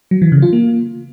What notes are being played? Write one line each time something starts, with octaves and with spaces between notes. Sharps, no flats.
F#3
E3
C#3
F4
A#3